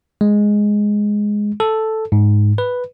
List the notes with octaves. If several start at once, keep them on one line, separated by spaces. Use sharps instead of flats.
G#3
A4
G#2
B4